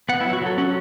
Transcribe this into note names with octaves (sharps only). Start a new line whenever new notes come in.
B3 F#5
E4
F#3
F#4
F#3 A4
C#4 F#4